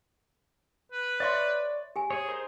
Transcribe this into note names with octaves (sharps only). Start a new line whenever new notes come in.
B4
C#5 D5 E5 C6 C#6
G4 G#5
G#4 C#5
D#4 A#4 C5